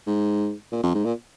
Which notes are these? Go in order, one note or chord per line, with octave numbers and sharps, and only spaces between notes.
G#2
A#2
F2
G#2
A#2